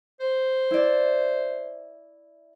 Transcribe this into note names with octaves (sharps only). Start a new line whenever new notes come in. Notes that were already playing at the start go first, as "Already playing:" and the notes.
C5
E4 D5